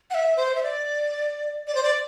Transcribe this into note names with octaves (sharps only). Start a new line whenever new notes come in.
F#5
E5
C5
E5
D5
D5
C5
D5